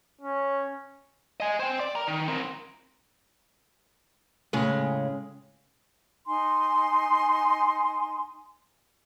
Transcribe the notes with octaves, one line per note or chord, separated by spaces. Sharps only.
C#4
D#5 G#5
C5 G5
D5
A#4 A#5
D#3
C4 A#4
A2 C#3 G#3
D#4 G#5 C6